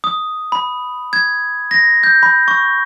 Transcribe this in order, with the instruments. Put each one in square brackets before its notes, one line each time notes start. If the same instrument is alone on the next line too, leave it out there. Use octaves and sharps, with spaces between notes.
[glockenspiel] D#6
B5
G#6
A#6
G6
B5
C#6